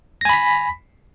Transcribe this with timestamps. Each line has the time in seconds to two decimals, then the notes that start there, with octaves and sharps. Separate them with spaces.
0.21 A#6
0.25 G#5
0.29 B5
0.33 B6